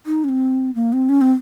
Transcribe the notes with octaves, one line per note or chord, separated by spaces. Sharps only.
D#4
C#4
C4
A#3
C4
C#4
C4